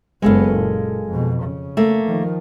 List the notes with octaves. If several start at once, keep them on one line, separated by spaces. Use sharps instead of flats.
F#1 G#3 B3 A4 F5
A#2
F2 B2
C#3
A3 A#3
D#3 F3